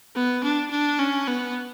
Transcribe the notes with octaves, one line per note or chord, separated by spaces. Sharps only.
B3
D4
D4
C#4
B3